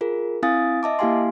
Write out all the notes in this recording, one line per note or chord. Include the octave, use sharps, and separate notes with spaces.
F4 G#4 A#4
C4 E4 F5 G#5 D#6 A6
D#5 E5 A5 D6
A#3 E4 G4 F5 G#5 C6